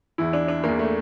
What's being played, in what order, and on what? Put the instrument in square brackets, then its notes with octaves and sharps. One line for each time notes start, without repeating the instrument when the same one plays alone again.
[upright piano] E2 E3 E4
D4
D4
E2 E3 A#3
A3